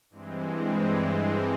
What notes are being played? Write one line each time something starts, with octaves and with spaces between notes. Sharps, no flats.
G2 E3 G#3 C4